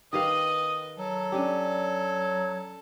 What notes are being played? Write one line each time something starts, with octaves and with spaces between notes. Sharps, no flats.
D#3 G4 B4 D#5 F5 D#6
F#3 A4
C#4 D4 G4